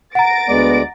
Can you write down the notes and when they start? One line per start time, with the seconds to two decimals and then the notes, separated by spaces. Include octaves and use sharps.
0.15 F#5 A#5 A6 A#6 D7
0.49 D2 G#3 B3 D5